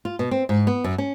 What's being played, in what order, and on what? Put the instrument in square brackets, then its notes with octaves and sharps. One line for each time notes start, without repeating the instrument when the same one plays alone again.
[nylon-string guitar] F4
B2
C4
G#2
B3
F#2
C#4